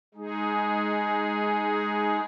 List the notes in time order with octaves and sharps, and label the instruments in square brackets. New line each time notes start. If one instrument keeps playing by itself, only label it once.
[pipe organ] G#3 D#4 G#4